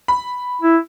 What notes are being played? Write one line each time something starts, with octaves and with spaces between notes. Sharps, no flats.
B5
E4